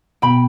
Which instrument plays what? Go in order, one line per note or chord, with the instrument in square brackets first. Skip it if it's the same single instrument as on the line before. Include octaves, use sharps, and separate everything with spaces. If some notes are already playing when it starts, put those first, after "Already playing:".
[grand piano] B2 [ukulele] G5 B5